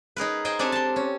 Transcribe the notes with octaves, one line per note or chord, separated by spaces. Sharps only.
D#4 G#4 A#4 B4
C5 D#5 G5 G#5
C4 D4 G4 A4 G#5
A5 C6
C#4